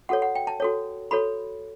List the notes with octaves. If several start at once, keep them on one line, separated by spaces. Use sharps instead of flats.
F#4 A4 C#5 F#5
F#5
G5
A5
F#4 A4 C#5
F#4 A4 C#5 B5